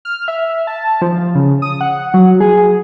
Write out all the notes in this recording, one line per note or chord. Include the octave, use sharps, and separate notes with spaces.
F6
E5
A5
F3
F3
C#3
D#6
F#5
F#3
G#4
G#4